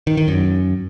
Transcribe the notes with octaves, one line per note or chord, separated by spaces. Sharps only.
D#3
D#3
F#2